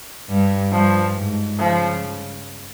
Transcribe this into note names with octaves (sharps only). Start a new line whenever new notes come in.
G2
G2 F3
G#2
C#3 F3